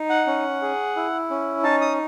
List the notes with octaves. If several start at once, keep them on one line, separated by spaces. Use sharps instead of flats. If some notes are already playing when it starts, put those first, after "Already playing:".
Already playing: D#4
F#5
C#4
G#4
E4
C#4
D#4 A5
D#6